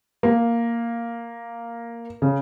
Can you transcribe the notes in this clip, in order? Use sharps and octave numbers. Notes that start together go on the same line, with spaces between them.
A#3
C#3